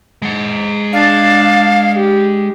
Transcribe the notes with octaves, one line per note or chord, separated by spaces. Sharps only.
G#3 F#5
D4 F5 A5
G4